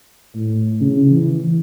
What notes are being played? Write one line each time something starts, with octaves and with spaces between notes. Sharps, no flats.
A2
C#3
E3